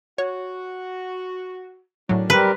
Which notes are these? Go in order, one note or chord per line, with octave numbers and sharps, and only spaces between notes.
F#4 C#5
A2 D#3 F#3 C#4 D4
G3 C4 G4 A#4 B4